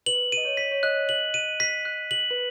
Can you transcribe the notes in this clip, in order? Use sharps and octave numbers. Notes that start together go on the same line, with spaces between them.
B4 F#7
D#5 D#7
C#5
B6
C#5
D#5 F#6
F#7
D#7
B6
F#6
F#7
B4